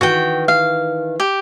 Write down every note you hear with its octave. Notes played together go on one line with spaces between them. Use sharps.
D#3 E3 F#4 G5
F5
G4